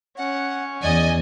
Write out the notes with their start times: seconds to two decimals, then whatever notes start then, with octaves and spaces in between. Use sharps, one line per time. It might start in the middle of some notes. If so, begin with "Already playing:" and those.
0.17 C#4 F#5
0.82 E2 D5 D#5 G#5